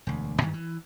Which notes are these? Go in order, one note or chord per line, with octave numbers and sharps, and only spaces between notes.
E1 D2
G2 D#3 E3 G3
E3